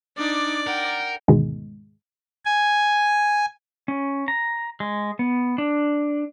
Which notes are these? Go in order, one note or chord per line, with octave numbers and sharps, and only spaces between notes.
D4 D#4 D5 D6
A#4 F#5 G5
D2 G#2 B2 D#3 G#3
G#5
C#4
A#5
G#3
B3
D4